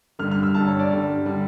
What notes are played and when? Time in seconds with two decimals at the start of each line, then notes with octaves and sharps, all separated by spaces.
0.19 G2 D3 G3 F6
0.31 F6
0.43 E6
0.55 G2 D3 G3 A5
0.67 C#5
0.79 D5
0.91 G2 D3 G3
1.26 D3 G3